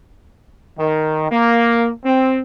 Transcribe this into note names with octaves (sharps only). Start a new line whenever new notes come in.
D#3
A#3
C4